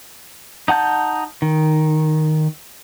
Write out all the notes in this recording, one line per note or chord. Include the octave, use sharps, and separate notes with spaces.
D#4 F#5 A5 G6
D#3